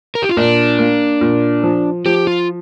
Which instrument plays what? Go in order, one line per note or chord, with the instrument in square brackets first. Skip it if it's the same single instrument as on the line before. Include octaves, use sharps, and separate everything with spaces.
[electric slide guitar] A#4
G4
F4
[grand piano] A#2 [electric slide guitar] D4
[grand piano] A#3
A#2
F3
[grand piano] F3 [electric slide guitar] G4
[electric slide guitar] F4